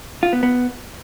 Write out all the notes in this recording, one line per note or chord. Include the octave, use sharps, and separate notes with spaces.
F4
B3
B3